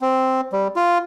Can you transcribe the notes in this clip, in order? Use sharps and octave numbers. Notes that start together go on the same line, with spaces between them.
C4
G3
F4